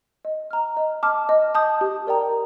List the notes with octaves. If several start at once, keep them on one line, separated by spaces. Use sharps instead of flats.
D#5
A#5 F6
D#5
A5 D6 F6
D#5
A5 D#6 G6
G4
A#4 D5 G5 A#5